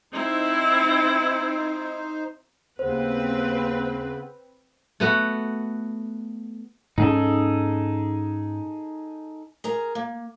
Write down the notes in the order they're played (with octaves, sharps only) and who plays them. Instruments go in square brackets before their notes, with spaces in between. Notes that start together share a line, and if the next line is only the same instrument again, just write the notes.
[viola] C4 E4 [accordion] D#4 C5
[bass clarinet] D#2 [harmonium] C#3 B3 [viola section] C4 B4 [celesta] C5
[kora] A3 B3 F#4
[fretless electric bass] G#2 C#4 [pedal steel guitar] D#4 G#4 A4
[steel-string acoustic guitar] G#4 A#4 A#5
A#3